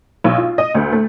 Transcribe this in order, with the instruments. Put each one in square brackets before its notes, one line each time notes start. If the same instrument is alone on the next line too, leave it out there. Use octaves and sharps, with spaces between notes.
[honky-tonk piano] B1
F4
D#5
D2
A3